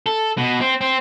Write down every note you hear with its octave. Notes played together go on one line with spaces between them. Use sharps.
A4
B2
C4
C4